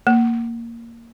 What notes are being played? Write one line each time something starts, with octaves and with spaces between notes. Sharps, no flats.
A#3